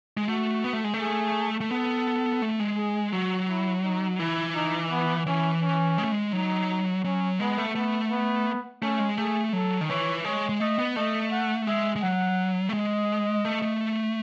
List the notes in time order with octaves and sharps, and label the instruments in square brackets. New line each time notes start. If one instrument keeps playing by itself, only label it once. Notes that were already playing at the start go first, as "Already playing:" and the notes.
[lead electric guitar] G#3
[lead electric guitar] A3 [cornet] F#4
[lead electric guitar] B3
A3
G#3
A3
[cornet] G#4
[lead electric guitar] A3
[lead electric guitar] B3 [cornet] A4
[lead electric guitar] A3
G#3
[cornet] G#4
[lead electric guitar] F#3 [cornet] F#4
[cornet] E4
D#4
[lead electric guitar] E3 [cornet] E4
[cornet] D#4
B3
[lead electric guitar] E3 [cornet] C#4
[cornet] C#4
[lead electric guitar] G#3
A3
G#3
[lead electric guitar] F#3 [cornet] D#4
[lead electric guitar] F#3 [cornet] C#4
[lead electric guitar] G#3 [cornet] B3
[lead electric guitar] A3
[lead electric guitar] A3 [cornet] B3
[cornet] B3
[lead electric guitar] A3 [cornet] C#4
[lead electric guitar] G#3
[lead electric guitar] A3 [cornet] G#4
[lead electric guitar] F#3 [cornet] A4
[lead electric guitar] D#3
[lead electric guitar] E3 [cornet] C#5
[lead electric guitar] G#3 [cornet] C#5
[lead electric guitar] G#3
[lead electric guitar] A3 [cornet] D#5
[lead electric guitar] B3
[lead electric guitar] A3 [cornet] D#5
[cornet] F#5
[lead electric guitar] G#3 [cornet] E5
[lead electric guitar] G#3
[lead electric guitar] F#3 [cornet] F#5
[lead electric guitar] A3
[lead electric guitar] G#3 [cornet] D#5
[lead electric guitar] A3
A3